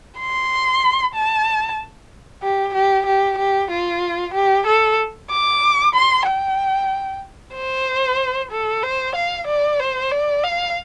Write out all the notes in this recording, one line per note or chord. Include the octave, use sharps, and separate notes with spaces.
C6
A5
G4
G4
G4
G4
F4
G4
A4
D6
C6
G5
C5
A4
C5
F5
D5
C5
D5
F5